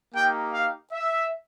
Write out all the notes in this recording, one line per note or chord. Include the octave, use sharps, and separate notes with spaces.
A#3 D#4 G4 G5
F5
E5